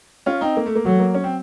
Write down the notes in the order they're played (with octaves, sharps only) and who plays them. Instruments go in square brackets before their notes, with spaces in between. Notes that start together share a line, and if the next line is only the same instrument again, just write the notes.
[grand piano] C#4 F4
C4 D#4
A#3
A3
A#3
[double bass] F#3 [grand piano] A3
[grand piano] A#3
C#4
C4